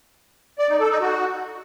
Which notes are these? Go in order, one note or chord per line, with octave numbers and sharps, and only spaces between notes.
D5
D#4
A4
D#4
F#4